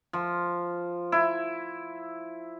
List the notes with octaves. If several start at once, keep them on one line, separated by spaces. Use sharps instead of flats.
F3
E4